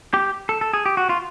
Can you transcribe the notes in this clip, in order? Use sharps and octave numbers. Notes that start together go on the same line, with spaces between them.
G4
A4
A4
G#4
G4
F#4
F4